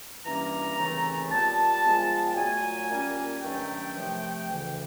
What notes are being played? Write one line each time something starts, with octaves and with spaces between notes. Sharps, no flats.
G2 E3 G3 A#3 C#4 A#5
D#2 C#3 E3 A3 C4
A#2 G3 B3 A5
A#2 F3 G#3 B3
G5
A#2 F#3 A3 G#5
A#2 G3 A#3 C#4
G2 D#3 F#3 A3 C#4 G5
C3 F3 A3
D2 C#3 E3